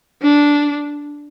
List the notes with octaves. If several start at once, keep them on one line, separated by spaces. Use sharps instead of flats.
D4